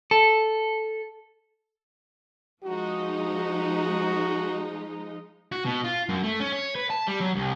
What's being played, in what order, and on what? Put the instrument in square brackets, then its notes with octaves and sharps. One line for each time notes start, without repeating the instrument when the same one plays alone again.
[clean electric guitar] A4
[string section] F3 G#3 D#4 [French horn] F#4
[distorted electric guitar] F#4
B2
F4
F#2
A3
C#4
C#5
B4
A5
G3
F#3
C2